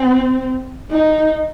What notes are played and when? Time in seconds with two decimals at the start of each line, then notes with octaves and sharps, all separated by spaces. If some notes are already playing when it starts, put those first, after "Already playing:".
Already playing: C4
0.91 D#4